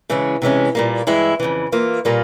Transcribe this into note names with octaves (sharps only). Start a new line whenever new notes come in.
C#3 E3 G#3 C#4
C3 E3 G#3 C#4
A#2 G3 A#3
G2 E3 G#3 E4
F2 C#3 E3
E3 A#3 F4
A#2 G3 A#3 F4